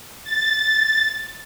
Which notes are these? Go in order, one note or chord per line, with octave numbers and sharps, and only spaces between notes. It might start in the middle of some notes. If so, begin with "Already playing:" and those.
A6